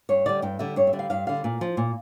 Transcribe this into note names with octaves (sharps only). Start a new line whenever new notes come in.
G2 C#5
D3 G3 D5
G2 G5
D3 G3 E5
G2 C#5
E5
D3 G3
F5
G2 F5
D3 G3 F5
A#2
F3
A#2